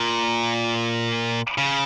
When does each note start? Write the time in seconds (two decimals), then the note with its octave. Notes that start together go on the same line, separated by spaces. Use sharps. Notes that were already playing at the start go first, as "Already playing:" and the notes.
Already playing: A#2
1.58 C#3